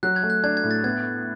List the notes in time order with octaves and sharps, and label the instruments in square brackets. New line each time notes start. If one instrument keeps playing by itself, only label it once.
[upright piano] F#3 [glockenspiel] F#6
[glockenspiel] G#6
[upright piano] A3
[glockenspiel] F#6
[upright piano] D4 [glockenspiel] G#6
[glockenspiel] G#6
[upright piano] A2
[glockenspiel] A6
[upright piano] B3 [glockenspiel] G#6